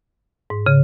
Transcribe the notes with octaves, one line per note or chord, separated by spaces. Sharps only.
G#2
C#3